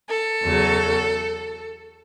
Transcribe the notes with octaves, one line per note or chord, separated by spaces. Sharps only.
A4
E2 C#3 F#3